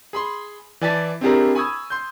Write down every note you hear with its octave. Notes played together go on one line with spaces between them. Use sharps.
G#4 B5 C6
E3 D5 G#5 A5 A6 B6
C4 D4 E4 G4 G#4 A#4
G#5 B5 C#6 D#6 E6 G#6
C6 G6